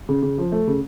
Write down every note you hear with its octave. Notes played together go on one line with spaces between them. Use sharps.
C#3
C#3
F3
A3
C#3